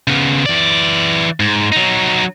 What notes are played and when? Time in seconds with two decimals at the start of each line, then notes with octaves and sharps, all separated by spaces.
0.08 C#3 B3
0.46 E3 D5
1.40 G#2
1.72 F#3 D#4